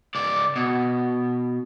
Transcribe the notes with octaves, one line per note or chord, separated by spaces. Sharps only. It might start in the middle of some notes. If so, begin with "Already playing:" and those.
C#2 D5
B2